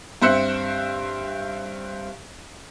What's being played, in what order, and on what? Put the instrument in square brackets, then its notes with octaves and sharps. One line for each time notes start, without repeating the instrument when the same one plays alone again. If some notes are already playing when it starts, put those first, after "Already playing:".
[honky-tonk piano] G2 C4 C5 E5 F#6 C#7